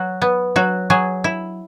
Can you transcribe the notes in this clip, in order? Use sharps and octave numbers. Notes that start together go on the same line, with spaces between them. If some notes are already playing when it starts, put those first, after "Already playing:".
Already playing: F#3 F#4
B3
F#3 F#4
F#3 G#4
E4